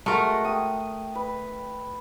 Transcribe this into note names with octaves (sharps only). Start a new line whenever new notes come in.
G#3 A3 F#4 A#4
G5 D#6
B4